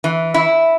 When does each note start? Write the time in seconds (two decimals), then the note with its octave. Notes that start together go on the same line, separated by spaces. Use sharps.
0.04 E3
0.34 E4